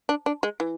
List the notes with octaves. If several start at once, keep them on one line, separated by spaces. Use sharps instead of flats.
D4
D4
G#3
E3